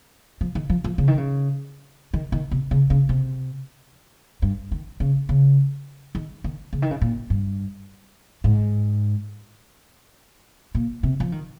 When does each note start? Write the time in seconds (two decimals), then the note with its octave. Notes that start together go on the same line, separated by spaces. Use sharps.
0.41 F3
0.55 D#3
0.70 F3
0.84 F3
0.98 C#3
1.08 D#3
1.18 C#3
2.14 D#3
2.32 D#3
2.51 C3
2.71 C#3
2.90 C#3
3.09 C3
4.42 G2
4.72 D#3
5.00 C#3
5.29 C#3
6.15 D#3
6.44 D#3
6.73 C#3
6.82 D#3
6.91 C#3
7.01 A#2
7.30 G2
8.44 G#2
10.75 A#2
11.03 C3
11.20 F3
11.32 D#3